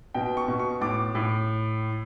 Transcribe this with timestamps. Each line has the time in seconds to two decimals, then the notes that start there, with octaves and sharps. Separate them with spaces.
0.14 B2 G5
0.37 C#6
0.48 B2
0.59 C#6
0.81 A2 D6
1.15 A2